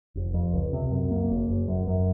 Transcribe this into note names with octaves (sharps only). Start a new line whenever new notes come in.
F1
F2
C#2
C3
F#2
A#3
F#1
F#1
F#2
F#2